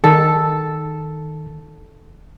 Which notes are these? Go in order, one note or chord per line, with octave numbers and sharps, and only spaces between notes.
D#3 A4